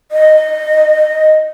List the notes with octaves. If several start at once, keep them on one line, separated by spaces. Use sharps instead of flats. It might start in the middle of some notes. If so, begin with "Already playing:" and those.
D#5